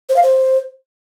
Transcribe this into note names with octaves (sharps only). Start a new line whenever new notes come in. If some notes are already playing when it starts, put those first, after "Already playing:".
C5
F5
C5